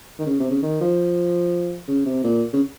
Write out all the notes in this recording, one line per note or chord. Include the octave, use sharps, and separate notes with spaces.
D#3
C#3
C3
C#3
D#3
F3
C#3
C3
A#2
C#3